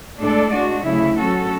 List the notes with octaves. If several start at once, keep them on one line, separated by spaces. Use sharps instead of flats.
A2 G#3 D4 A4 D5
G#3 D4 F#4
D2 C#3 F#3 A3 E4
F#3 C#4 F#4 A4